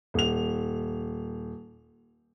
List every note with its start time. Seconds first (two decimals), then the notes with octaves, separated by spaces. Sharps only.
0.14 D#1 F7